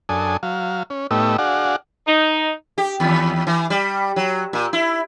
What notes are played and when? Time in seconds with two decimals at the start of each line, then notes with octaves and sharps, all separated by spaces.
0.09 F#2 D4 A4 G#5 D#6
0.43 F#3 F5
0.90 C#4
1.11 A2 A3 B3 D#4 G4 E6
1.39 D4 F#4 G#4 D5 F5 F#5
2.07 D#4
2.78 G4
3.00 D#2
3.47 E3
3.70 G3
4.16 F#3
4.53 A#2
4.73 E4